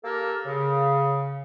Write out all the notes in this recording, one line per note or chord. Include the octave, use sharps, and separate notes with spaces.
A#3 G4 A4 A#4
C#3